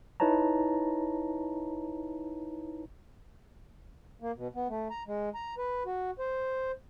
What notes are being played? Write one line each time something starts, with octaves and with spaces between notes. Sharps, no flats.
D#4 E4 B4 C#5 A5 A#5
A#3
B2
B3
A3
A#5
G#3
A#5
B4
F#4
C5